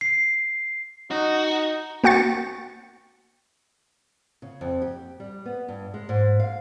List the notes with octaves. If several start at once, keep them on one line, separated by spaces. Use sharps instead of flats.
C7
D#4 F#4
A#3 F#4 G5 C#6 A6
C#3
F2
G4
G3
B3
G2
G#3
G#2
F5